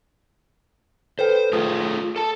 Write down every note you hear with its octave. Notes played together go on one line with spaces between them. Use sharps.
A4 B4 C5 G5
A3 F4 G#4 D#6
A4 A5